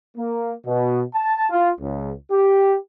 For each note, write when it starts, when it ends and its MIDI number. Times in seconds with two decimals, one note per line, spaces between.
0.17 0.53 58
0.66 1.03 47
1.14 1.47 81
1.50 1.69 65
1.80 2.12 37
2.32 2.76 67